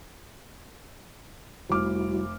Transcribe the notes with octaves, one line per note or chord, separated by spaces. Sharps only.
F1 G3 E4 F#4 D6 F6